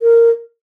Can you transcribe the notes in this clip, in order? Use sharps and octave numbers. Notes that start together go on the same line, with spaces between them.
A#4